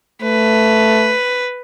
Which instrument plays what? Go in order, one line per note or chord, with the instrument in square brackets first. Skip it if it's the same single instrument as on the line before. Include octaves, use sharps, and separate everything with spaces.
[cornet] A3 [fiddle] B4